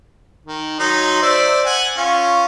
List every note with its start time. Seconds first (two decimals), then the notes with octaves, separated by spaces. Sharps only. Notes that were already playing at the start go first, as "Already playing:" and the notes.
0.46 D#3
0.80 F#3 D#4 C6
1.22 C5 D5 E5
1.66 F#5 G#5
1.97 C#4 F4